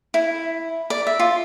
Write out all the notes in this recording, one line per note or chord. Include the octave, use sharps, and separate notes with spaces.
E4
D5
E5
F4